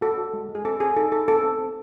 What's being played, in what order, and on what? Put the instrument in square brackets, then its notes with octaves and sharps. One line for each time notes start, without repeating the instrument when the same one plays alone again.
[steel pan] F#4 A4
F#4
G#3
G#3
G#4
C4 A4
C4 G#4
D#4 A4
D#4 A4
C4 A4
C4
C4